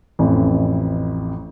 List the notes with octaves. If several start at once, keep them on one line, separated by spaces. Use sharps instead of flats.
A1 F2 E3